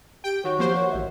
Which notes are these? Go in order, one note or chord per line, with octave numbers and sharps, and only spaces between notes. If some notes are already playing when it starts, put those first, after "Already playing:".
G4 G5 D7
D#3 F#4 C#5
F3 A#3 G4 C5
C#5
A1 D#3 E5